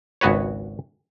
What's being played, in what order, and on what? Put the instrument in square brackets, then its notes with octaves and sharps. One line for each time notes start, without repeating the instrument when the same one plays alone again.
[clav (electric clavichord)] G#1 C#2 B3 F#4 B4 C#5